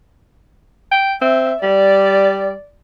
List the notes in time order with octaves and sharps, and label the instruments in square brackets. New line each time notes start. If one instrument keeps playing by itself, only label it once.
[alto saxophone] G5
[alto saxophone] C4 [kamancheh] E5
[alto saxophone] G3 [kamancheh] D5